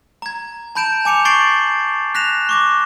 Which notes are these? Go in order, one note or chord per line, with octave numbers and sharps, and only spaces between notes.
A#5 G#6
A5 B5 G6 D7 E7
G#5 D6 C#7 F7
C#6 G6 A6 C7 D7 F#7
F#6 A#6 B6 E7 F7
C#6 D6 A#6